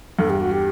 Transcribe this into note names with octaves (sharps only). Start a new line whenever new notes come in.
E2 G2 A4
G4
F#4
G4